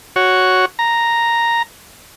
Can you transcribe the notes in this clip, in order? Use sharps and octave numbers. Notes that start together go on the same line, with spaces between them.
F#4 C#5
A#5